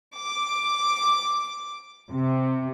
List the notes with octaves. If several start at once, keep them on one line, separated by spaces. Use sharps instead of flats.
D6
C3